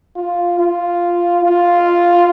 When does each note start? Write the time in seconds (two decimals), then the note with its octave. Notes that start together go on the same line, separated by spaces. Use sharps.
0.16 F4
0.59 F4
1.44 F4